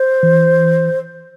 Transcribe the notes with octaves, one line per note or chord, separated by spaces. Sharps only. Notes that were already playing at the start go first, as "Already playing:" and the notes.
Already playing: C5
E3